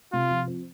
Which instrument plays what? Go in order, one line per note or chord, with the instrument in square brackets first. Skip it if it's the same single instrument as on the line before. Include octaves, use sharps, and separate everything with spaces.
[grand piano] C3 [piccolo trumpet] F4
[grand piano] F3
C4